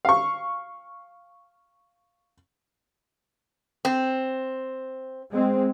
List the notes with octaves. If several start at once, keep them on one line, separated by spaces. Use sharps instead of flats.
F5 C#6
C4
G#3 C4